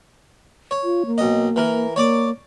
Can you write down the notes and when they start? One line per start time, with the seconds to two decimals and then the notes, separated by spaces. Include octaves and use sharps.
0.71 C#5
0.84 F4
1.06 A#3
1.18 B1 D#5
1.56 E3 A#4
1.96 A#3 C#5 D5 D6